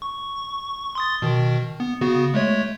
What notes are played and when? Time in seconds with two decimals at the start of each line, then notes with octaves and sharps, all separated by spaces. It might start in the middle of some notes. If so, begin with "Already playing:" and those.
0.02 C#6
0.95 C6 D#6 A6
1.22 B2 D#3
1.80 B3
2.01 C#3 B3 F#4
2.34 G#3 A3 C#5